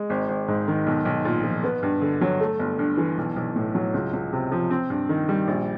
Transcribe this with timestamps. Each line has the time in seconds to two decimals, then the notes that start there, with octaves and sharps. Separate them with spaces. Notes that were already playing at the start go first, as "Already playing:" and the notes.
Already playing: G#3
0.10 G#1
0.28 G#1
0.48 G#2
0.68 D#3
0.86 B1
1.05 B1
1.25 A#2
1.44 F3
1.63 B3
1.83 G2
2.02 D3
2.21 F#3
2.40 A3
2.59 G1
2.79 G2
2.97 E3
3.17 B1
3.36 B1
3.56 A2
3.75 F#3
3.94 C#2
4.13 C#2
4.33 C3
4.52 F3
4.71 C4
4.90 G2
5.09 D#3
5.29 G3
5.47 A#1